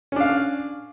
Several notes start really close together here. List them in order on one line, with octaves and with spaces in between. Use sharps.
C#4 D4 F5